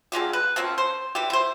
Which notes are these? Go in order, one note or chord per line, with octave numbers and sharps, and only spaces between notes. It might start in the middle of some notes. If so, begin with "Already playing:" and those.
D3 G#3 F4 G4
B4
F3 A#3 C4 C#4
C5
E3 G4
E4 C5